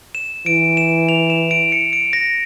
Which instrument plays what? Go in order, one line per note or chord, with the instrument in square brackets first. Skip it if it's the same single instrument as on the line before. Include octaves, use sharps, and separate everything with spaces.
[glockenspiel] E7
[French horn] E3 [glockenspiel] D7
[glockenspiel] E7
F7
E7
D7
C#7
D7
A#6